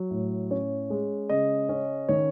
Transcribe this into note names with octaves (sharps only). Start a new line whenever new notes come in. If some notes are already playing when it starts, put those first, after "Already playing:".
Already playing: F#3
A2
C#4 C#5
G#3
C#3 D#5
C#4
D#3 C#5